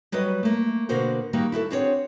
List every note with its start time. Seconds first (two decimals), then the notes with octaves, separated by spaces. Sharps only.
0.12 F#3 G3 F#4 B4 D#5
0.43 A3 A#3
0.89 B2 D3 A#3 F#4 A#4 C5
1.33 D#3 G3 A#3 F#4
1.52 E4 F#4 G4 A4
1.70 C4 D4 F#4 G#4 A#4 C#5